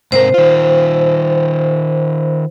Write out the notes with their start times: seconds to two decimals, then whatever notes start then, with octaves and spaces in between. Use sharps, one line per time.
0.12 G#2 C3 A#4 C5
0.34 D#3 F4